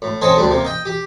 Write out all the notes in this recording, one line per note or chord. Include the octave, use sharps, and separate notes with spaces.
A2
C4 A4 C5 C#5 D#5 G#5
D2 G3 D4
C3 A#3
D#5 G5
G4